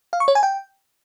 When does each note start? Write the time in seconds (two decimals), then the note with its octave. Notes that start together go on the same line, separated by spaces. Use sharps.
0.13 F5
0.20 C#6
0.28 C#5
0.35 G#5
0.43 G5